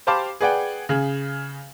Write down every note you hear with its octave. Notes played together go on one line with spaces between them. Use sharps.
G4 C5 F5 A5 B5 D6
G#4 B4 D5 F#5 G5
C#3 G#4